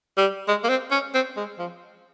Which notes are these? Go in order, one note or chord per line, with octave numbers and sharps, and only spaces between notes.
G3
G#3
A#3
C4
C#4
C4
G#3
F3